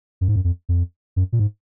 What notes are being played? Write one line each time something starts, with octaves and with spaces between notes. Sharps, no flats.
F#2
G#2
F#2
F2
F2
F#2
A#2
G#2